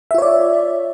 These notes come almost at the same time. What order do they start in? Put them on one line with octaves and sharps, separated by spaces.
E5 F4 C#5 D5